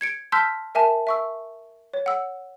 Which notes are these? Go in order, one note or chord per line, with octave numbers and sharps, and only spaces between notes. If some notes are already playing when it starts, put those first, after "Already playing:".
G#6 C#7 D7
A5 C6 E6 F6 G6 B6
A#4 E5 G#5 A5
E5 C#6 E6
C#5
F#5 E6